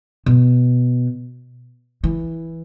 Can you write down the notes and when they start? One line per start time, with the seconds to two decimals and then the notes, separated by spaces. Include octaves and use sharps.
0.26 B2
2.04 E3